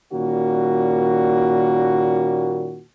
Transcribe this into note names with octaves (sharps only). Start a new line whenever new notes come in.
A#2 D#3 G3 A#3 C#4 F#4